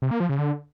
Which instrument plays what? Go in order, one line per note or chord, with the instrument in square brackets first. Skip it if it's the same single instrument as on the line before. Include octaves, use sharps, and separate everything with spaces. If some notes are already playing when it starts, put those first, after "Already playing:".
[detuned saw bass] C3
A#3
F3
C#3
D3